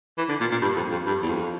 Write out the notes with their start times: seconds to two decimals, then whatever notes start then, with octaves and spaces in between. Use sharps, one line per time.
0.18 E3
0.29 D3
0.40 A#2
0.51 A#2
0.62 G2
0.76 F2
0.91 F2
1.06 G2
1.22 E2
1.29 F2